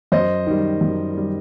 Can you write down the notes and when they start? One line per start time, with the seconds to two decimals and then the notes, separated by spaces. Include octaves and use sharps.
0.12 F#2 C5 D#5
0.47 D#3 G3
0.81 F#2
1.15 D#3 G3